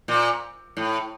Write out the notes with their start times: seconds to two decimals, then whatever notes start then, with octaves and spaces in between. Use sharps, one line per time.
0.08 A#2
0.77 A2